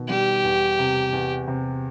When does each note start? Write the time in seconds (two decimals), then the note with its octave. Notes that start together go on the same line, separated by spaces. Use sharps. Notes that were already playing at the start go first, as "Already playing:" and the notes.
Already playing: B2 D#3
0.09 G3 G4
0.44 E2
0.79 C3
1.13 E2
1.48 C3